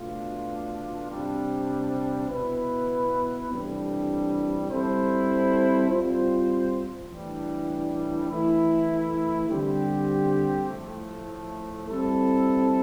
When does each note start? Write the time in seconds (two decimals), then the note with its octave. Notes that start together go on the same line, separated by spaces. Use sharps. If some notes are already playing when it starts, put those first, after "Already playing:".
Already playing: B2 A3 D4 F4
1.09 C3 G3 D4
2.29 B2 B3 E4 B4
3.48 C3 E3 G3 D4 A4
4.69 G3 C4 E4 A4 C5
5.88 G3 C4 F4 C5
7.09 A2 E3 G3 D4
8.28 E3 A3 E4
9.48 D3 G3 C4 G4
10.68 A2 F3 A3
11.88 G3 C4 E4 A4